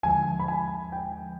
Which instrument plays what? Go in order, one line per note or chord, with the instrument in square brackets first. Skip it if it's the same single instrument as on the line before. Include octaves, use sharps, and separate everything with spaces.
[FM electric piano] D#2 D3 F3 G#3 [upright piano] G#5
[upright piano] B5
G#5
G5